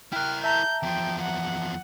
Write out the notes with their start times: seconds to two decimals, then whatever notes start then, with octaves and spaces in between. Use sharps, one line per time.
0.13 E4 A#4 G5 F6 F#6
0.44 E5 A5 A#5 G6
0.83 E2 F3 G5
1.21 F#5